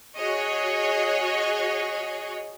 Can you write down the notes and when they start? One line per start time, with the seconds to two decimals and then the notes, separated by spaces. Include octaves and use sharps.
0.16 F#4 G#4 C#5 D#5